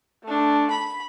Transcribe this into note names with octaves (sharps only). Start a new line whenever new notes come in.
A3 D4
B5